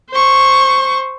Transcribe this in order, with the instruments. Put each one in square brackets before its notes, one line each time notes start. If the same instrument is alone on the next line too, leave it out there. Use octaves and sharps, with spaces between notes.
[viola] C5 C#6